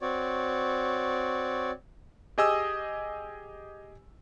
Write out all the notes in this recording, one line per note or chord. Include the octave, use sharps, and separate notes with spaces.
C4 F#4 C#5 D5
G4 G#4 D#5 G#5 D#6 E6